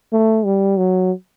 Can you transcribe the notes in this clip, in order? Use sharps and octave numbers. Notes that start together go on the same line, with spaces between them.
A3
G3
F#3